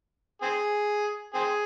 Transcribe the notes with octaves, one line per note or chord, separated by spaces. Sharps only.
C4 G#4
C4 G#4